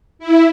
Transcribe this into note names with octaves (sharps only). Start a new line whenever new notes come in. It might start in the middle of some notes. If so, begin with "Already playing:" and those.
E4